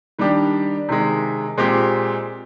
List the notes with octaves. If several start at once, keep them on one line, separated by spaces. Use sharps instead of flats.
D#3 G3 D4 G4
C3 D#3 G#3
A#2 G#3 C4 G4